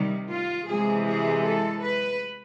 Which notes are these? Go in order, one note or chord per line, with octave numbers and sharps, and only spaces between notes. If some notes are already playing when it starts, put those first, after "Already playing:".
Already playing: C3 D#3 G3
F4
C3 E3 G#3 G#4
G#4
A4
B4